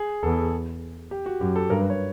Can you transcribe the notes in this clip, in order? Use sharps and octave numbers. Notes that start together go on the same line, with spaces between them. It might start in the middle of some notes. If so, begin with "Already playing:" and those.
Already playing: G#4
E2 A4
G4
F#4
F#2 G4
A4
G2 A#4
B4
C#5